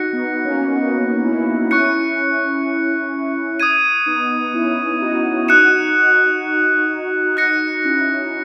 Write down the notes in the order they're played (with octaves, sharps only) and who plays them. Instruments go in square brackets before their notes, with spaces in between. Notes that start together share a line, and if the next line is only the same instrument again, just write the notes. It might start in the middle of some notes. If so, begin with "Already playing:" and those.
Already playing: [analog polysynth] D#4 F#4 [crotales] F#6 A#6 C#7
[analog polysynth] B3 D#4
A#3 C#4
B3 D#4
C#4 E4
[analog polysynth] C#4 E4 [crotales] C#6 F#6 C#7
[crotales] D#6 G#6 D#7
[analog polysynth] B3 D#4
C#4 E4
D#4 F#4
[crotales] D#6 F#6 C#7 E7
[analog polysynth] D#4 F#4 [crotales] F#6 A#6 C#7
[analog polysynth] C#4 E4